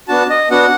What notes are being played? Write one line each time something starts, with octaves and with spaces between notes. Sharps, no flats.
B3 D4 F#4 A5
D#5
B3 D4 F#4 F#5